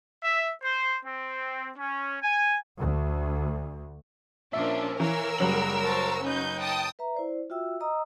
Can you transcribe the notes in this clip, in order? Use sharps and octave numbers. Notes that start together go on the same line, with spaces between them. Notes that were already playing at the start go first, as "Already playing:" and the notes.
E5
C5
C4
C#4
G#5
D2
A#2 F3 A#3 C#4 D4 E5
E3 A#4 C#5 F5 E6
F#1 F#3 G3 G#4 F#7
C5 A5 C#6
C#4 D#4 B4 G6
G5 A5 D#6
B4 E5 A#5
E4 C5 D5
F4 F#4 E5 G5 E6
D#5 A#5 D#6 E6